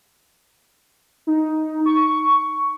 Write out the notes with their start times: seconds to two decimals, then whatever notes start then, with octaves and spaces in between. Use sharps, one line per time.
1.27 D#4
1.86 C#6